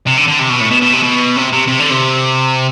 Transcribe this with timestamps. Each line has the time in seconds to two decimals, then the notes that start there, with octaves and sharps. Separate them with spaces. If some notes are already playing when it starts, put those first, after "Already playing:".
0.07 C3
0.18 D3
0.28 D3
0.39 C3
0.50 B2
0.61 A2
0.71 B2
0.82 B2
0.93 C3
1.03 B2
1.36 C3
1.53 C3
1.68 C3
1.79 D3
1.90 C3